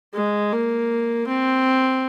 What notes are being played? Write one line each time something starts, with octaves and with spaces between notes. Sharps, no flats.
G#3
A#3
C4